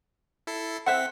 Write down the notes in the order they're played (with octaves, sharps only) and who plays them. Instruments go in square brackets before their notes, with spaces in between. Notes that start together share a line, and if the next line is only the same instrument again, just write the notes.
[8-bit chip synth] E4 A4 C7
[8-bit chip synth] C4 B6 [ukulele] C5 E5 F#5 [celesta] F#6 C#7